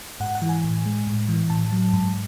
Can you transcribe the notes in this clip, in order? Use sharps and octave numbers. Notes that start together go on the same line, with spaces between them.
G#2 F#5
F#5
E3
G#5
A2
G#3
A2
E3
A2 A5
F#3
G#2